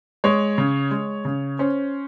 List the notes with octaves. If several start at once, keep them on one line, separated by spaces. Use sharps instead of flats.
G#3 C#5
C#3
G#3
C#3
C#4 C5